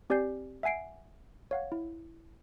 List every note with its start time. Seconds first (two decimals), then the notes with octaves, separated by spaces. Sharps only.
0.10 C4 G4 D5 G#5 G6 C7
0.63 E5 F#5 G#5 C7 D7
1.51 C#5 F5 F#5
1.72 E4